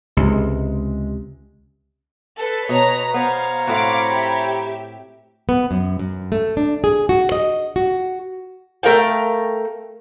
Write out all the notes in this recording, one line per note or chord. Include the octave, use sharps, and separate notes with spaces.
C#2 C3 G#3
A4 B4
B2 C#5 A#5
B3 C5 C#5 F5 A#5
A2 C4 F#4 F5 B5 D6
G4 E5
B3
F#2
F#2
A3
D4
G#4
F#4
D#5
F#4
A3 A#4 F5 G5